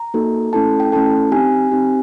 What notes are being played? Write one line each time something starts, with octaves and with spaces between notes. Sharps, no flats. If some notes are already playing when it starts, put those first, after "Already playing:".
Already playing: A#5
A#3 D#4 F#4 A4
A3 C#4 E4 A4 A5
G5
A3 C#4 E4 A4 A5
C4 D#4 G4 G#5
C4 D#4 G4